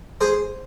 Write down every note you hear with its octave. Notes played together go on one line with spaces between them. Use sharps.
G#4 C5